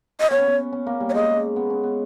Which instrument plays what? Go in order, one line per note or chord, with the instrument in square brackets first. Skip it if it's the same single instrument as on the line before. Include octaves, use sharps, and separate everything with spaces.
[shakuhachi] D#5
[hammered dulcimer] B3 [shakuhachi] C#5
[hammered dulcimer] C#4
B3
C#4
A#3
G3
[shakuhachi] C#5
[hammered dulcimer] G#3 [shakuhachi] D#5
[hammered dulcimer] B3
C#4
B3